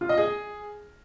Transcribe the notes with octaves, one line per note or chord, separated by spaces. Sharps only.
F4
D#5
G#4